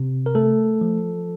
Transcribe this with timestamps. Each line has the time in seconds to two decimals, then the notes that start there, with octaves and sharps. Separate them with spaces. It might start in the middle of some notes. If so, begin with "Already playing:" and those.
Already playing: C3
0.26 A#4
0.35 A3 A4
0.81 F3